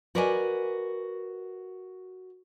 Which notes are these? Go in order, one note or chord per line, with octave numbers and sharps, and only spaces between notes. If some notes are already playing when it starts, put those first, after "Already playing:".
F#4 A#4 B4 D5 D#5 G#5